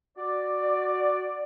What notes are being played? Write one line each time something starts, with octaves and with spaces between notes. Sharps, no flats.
F#4 D5